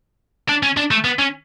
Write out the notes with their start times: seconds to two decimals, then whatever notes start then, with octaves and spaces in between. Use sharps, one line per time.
0.49 D4
0.63 C#4
0.77 D4
0.91 A3
1.04 B3
1.19 C#4